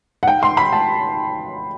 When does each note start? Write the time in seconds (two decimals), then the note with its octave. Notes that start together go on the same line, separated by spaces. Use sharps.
0.23 F#5
0.28 G5
0.43 C6
0.57 B5
0.73 A5